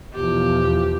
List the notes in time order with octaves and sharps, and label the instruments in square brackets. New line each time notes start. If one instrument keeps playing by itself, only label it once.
[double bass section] E2 B2 F3 [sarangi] G4